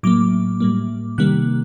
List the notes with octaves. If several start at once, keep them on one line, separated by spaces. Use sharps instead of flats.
A2 F#3 A#3 D6
A2 G3 A#3
C3 D#3 G3 A#3 F#6